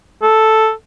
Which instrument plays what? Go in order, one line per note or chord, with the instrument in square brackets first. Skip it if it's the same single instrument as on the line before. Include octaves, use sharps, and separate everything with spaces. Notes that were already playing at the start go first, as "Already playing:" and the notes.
[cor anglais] A4